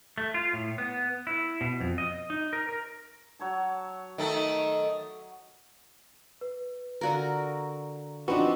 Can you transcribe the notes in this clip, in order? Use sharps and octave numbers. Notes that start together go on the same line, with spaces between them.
A3
F4
A2
B3
E4
B2
F2
D#5
D#4
A#4
A#4
F#3 C#5 A5
D#3 A3
B4
D3 F#4 A#4 D5 F5 A#5
F3 C4 D4 D#4 F#4 B4